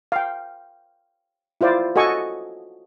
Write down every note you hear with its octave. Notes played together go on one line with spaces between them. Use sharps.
F5 G5
E4 F4 C5 D5
F#4 A4 D#5 G#5 C#6